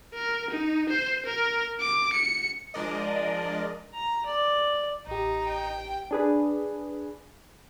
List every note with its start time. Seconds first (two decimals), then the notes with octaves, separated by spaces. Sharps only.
0.14 A#4
0.51 D#4
0.89 C5
1.26 A#4
1.80 D6
2.13 C#7
2.74 F3 G#3 D4 A#4 D5 D#5
3.93 A#5
4.26 D5
5.07 A1 D#4 G4
5.45 G5
6.11 D4 G#4 B4